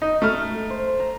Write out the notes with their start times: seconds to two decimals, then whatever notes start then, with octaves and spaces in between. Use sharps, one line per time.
0.02 D#4
0.22 A3 A#5 F6
0.70 C5
1.00 A#5